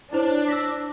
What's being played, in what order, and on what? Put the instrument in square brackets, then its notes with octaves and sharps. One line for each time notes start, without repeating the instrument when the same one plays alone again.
[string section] D4 [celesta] E4 C5 C#5
[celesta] E6 A#6 B6